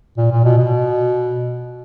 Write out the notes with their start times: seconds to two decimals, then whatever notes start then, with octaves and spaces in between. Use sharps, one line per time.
0.17 A#2
0.31 A#2
0.44 B2
0.58 B2